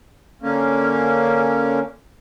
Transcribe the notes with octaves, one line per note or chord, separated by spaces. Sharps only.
D3 A#3 C#4